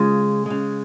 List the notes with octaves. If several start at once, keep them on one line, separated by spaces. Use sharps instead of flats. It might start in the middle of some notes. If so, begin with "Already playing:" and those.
Already playing: C#3 G#3 F4
C#3 G#3